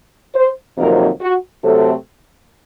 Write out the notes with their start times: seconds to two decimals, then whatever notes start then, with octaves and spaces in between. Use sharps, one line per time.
0.35 C5
0.77 F2 C3 D#3 F#3 A#3 A#4
1.21 F#4
1.63 C3 F#3 A3 C4 A4